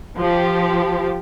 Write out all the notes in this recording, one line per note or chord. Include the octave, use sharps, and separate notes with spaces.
F3 G4